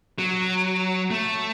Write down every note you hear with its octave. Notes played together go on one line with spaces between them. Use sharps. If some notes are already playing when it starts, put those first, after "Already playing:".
F#3
A3